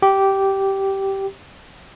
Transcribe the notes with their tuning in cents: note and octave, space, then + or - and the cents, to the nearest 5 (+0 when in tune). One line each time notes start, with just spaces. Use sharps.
G4 -10